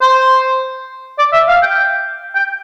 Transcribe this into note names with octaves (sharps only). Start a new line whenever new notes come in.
C5
D5
E5
F5
G5
G5